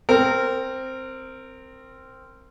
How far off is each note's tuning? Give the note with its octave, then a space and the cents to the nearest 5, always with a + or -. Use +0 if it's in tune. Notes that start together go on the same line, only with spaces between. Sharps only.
C4 +0 A#4 -20